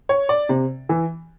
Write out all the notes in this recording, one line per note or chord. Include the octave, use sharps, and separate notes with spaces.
C#5
D5
C3
E3